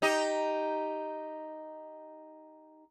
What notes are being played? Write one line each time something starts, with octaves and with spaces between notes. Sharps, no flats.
D#4 G4 D#5